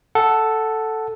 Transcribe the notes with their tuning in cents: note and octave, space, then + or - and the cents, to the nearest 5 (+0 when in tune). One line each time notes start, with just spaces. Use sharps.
A4 +0 F#5 +0